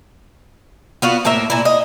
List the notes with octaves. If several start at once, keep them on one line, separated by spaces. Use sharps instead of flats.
B3 F4 F#4
A2 A#3 A#4 E5
A#2 E4
D#5